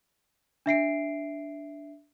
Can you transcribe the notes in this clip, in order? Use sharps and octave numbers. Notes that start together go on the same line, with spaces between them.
D4 E5 C7 D7